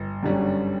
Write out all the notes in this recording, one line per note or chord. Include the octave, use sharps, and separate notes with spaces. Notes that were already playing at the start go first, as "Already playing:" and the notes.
Already playing: G1
F#2 D3 G3 C#4